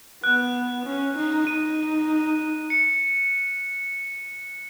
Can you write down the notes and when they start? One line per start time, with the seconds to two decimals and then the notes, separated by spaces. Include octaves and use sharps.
0.23 B3 F#6
0.85 C#4
1.16 D#4
1.47 D#4 D#7
2.70 C#7